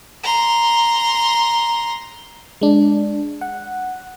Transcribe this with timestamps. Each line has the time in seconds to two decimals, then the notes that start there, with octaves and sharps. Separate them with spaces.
0.24 A#5 C6
2.61 G#3 D4
3.41 F#5